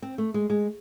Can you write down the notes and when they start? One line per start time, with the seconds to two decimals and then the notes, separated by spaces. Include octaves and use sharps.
0.02 C4
0.18 A3
0.34 G#3
0.50 G#3